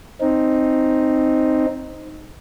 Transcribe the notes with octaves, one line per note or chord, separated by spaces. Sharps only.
C4 D#4